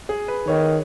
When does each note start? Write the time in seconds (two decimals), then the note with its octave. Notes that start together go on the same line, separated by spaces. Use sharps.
0.09 G#4
0.28 B4
0.47 D#3 C#5